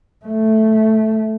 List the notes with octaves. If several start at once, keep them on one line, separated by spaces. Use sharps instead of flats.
A3